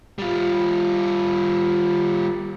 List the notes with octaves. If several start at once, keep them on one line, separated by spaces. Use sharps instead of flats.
G3 F4